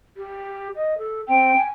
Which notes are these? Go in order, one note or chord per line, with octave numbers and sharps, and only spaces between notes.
G4
D#5
A4
C4 G5
G#5